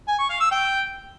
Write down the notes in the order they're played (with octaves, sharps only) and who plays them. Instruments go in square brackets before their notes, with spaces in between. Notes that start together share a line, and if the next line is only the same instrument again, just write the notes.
[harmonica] G#5
C#6
F5
E6
G5